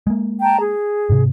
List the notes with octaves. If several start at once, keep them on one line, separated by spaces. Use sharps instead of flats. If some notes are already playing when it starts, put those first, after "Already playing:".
G#3 A#3
G5 A5 A#5
G#4
G#2 C3